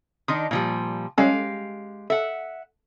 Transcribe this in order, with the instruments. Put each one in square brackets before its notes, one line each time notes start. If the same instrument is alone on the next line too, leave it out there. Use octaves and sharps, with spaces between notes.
[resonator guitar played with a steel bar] D#3 D4 D#4 [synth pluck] C6 D#6
[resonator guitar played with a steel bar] A#2 F3 G3
[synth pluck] G3 C#4 A4 [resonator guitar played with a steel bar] G#3 G4 F5
[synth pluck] A4 [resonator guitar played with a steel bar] E5 F#5